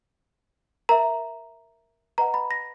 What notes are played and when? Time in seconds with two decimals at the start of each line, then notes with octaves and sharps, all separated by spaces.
0.89 A#4 E5 A#5
2.18 B4 D#5 F#5 A#5
2.34 B5
2.51 A#6